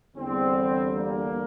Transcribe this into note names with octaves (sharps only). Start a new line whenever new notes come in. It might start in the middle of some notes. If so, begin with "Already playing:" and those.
E2 D3 G3 C4
A#3